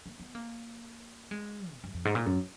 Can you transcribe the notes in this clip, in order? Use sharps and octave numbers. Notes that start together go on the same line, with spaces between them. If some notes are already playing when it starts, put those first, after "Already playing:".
A#3
B3
A#3
G#3
A#2
F#2
F2
G#2
A#2
F#2